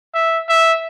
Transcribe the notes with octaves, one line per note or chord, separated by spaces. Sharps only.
E5
E5